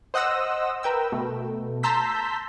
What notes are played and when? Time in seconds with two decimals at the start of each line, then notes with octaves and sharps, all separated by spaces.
0.14 C5 D#5 F#5 D#6 E6 A#6
0.83 A#4 B4 G5 E6
1.12 B2 A3
1.83 A5 A#5 C6 E6 G6 B6